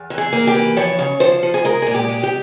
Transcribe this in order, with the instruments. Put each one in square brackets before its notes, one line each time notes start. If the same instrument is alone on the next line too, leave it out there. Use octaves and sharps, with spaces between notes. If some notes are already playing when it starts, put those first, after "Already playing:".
Already playing: [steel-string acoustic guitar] E2
E3
G#4
A#3
G4
E3
F3 C#5
C#3
F3 C5
F3
G#4
G#3 A#4
A#2 G#4
G4
G#3
G4